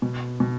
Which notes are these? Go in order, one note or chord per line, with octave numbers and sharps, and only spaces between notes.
B2
B2